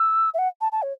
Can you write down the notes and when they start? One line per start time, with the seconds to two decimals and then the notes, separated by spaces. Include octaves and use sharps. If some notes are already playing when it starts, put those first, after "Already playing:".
Already playing: E6
0.34 E5
0.38 F#5
0.61 A5
0.72 A5
0.82 C#5